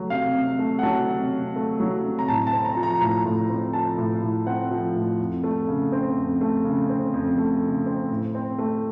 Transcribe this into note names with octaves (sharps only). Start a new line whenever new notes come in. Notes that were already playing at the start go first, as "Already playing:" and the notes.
Already playing: F#3 A3
C3 F5
C3
A3
F#5
F#3 A5
C3
C3
A3
F#3
C3
A#5
A2 A5
A5
C4
A#5
F3
A#5
A2 A#5
A2
C4
F3 A5
A2
A2
C4 F#5
F3
A2
F2
A3
C#3
C4
F2
A3
C#3
C4
F2
A3
C#3
C4
A2
C4
A3